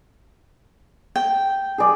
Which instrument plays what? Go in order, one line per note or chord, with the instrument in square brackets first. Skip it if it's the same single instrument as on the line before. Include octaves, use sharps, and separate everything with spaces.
[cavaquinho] G5
[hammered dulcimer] G#4 D5